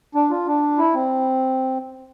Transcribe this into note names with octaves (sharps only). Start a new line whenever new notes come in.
D4
F4
D4
E4
C4